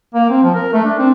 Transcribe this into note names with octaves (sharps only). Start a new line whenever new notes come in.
A#3
C4
F3
A#4
A3
D4
C4